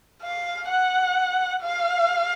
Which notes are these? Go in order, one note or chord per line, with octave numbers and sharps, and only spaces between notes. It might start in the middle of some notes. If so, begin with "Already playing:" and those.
F5
F#5
F5